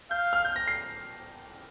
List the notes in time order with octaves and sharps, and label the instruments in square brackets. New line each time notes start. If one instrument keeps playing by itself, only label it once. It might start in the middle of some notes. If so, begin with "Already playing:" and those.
[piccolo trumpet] F5 [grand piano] G6
[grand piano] F6
G6
A#6
C7